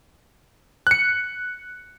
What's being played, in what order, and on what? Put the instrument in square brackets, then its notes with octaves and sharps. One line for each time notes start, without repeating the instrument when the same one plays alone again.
[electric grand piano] F#6 C#7